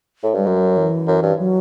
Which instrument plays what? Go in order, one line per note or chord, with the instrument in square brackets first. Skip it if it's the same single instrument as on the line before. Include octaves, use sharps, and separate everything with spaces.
[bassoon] A2
[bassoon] G2 [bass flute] G3
[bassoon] F#2 [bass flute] F#3
[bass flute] E3
[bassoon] F#2
G2
[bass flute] F#3